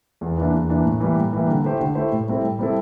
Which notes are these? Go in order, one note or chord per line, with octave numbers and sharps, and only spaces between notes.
E2
E3 A#3 D4
E2
E3 A#3 D4
A2
E3 G3 A#3
A2
E3 G3 A#3
D3
A3 E4 G4 C5
D3
A3 E4 G4 C5
A2
G3 C4 E4 A4
A2
G3 C4 E4 A4